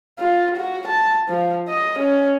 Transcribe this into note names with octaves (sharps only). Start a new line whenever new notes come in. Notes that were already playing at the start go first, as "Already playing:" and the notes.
F4
F#4
A5
F3
D#5
C#4